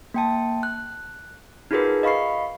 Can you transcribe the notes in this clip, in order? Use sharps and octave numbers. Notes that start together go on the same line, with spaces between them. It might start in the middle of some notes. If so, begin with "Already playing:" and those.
A#3 G5 A5
F#6
D#4 F4 F#4 G#4 A#4 B4
D#5 F5 B5 C#6 C7